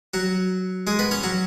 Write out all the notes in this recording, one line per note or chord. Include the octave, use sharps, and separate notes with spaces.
F#3 F#4
G#3 G#4
B3 B4
C#4 C#5
F#3 F#4